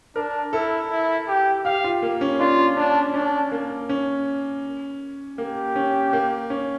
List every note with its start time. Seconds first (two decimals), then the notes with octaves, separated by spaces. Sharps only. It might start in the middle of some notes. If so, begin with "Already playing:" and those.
0.16 D4 A#4
0.53 E4 A4
0.90 E4
1.28 G4
1.65 G4 F5
1.84 F4
2.02 A#3
2.21 C#4
2.40 D4 F4
2.77 C#4 D4
3.14 C#4 D4
3.52 A#3
3.89 C#4
5.38 A#3 G4
5.76 C#4
6.13 A#3
6.50 C#4